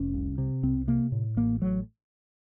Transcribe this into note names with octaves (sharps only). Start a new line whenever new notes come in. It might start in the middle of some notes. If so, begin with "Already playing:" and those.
Already playing: F1 C#4
C2
C3
C2 C4
C3 A#3
A2
A1 A#3
A2 F#3